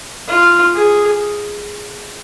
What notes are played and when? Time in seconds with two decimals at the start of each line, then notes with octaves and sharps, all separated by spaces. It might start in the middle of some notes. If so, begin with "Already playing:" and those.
0.28 F4
0.74 G#4